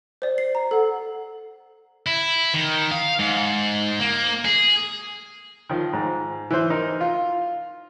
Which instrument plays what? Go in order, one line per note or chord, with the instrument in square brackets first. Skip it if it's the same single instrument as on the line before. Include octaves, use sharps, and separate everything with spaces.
[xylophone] C5 D5
C7
A#5
A4 F#5
[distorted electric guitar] E4
D#3
F5
G#2
A#3
G#4
[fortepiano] D#3 F3
G#2
E3 C5
D#4 A#4
F4